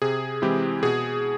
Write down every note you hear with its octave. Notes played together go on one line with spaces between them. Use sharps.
C3 G#4
E3 G#3 C4 E4 G4
B2 G#4